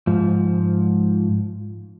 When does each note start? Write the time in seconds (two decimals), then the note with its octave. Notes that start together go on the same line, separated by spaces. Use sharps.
0.07 G#2 F3